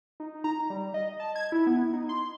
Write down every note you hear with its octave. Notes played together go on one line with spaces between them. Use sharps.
D#4
A#5
G3
D#5
A5
G#6
E4
B3
D#4
C6